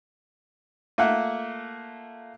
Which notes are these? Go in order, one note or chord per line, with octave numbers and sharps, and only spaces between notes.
A3 A#3 F4 E5 F#5